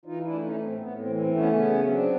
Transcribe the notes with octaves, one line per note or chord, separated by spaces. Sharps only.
E3 D#4 F4
D4 E4
A3
C#4 D#4
A2
C4
A2 B3
C4
E3
C4
A3
B3 C#4
C#3 B3 C#4
F#3
C4 D4
B3